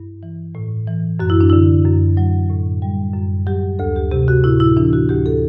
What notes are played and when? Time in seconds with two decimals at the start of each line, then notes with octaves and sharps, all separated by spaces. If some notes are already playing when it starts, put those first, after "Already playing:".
Already playing: G2 E4
0.23 E3
0.55 A2
0.87 E3
1.20 F#2 F#4
1.30 E4
1.41 D4
1.50 D3 E4
1.85 F#2
2.17 F#3
2.50 A2
2.82 G3
3.14 F#2
3.47 F#3 G4
3.79 D2 A4
3.96 G4
4.11 C3 G4
4.28 F#4
4.44 A2 E4
4.60 E4
4.77 E3 D4
4.93 F#4
5.09 D2 G4
5.26 A4